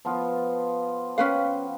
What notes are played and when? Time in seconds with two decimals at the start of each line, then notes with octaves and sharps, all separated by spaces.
0.05 F3 B3 F4
1.18 C#4 B4 F5 G5